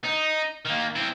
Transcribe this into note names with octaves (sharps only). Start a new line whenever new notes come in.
D#4
D#3 A#3
C4 E4